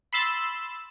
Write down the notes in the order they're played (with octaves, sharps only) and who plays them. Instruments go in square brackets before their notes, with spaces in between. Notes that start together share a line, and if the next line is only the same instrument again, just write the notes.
[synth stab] B5 C6 E6 A6